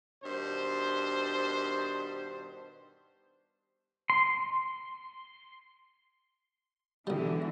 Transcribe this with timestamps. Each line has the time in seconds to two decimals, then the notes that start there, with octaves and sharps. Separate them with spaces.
0.24 G2 B2 D#3 D4 C5
4.10 C6
7.07 B1 D3 E3 G3